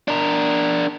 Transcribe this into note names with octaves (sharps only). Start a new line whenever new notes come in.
D4 A#4